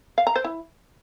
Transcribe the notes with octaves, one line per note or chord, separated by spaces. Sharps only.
F5
A#5
C5
E4